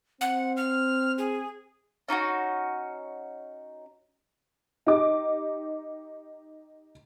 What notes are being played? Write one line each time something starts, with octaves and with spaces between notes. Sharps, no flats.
C4 F#5
F6
G#4
C#4 D#4 E4 F#4
D#4 G4 D6